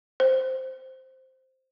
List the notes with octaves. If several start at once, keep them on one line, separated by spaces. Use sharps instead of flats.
C5